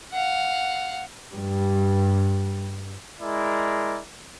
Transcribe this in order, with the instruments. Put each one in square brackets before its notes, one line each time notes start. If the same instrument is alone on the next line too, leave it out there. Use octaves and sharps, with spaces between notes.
[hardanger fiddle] F5 F#5
[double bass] G2 G3
[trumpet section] G#3 E4 A#4 D5